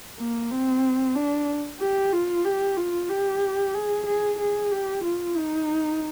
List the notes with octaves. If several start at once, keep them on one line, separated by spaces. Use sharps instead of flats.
A#3
C4
D4
G4
F4
G4
F4
G4
G#4
G#4
G#4
G4
F4
D#4